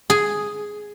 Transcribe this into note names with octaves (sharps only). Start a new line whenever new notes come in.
G#4